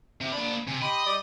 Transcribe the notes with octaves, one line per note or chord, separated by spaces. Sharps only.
C3
A#3 D4 B5
C3 G#5
G4 D#5 B5 C6
G3 D5 D6